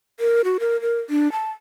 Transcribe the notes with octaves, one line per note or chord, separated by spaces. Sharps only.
A#4
F#4
A#4
A#4
D4
A5